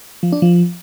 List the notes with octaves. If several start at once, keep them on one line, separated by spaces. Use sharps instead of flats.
F3
D4
F3